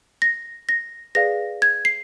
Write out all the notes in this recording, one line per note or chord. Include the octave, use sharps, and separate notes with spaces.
A#6
A#6
G#4 B4 D5 F5 A#6
G#6
C7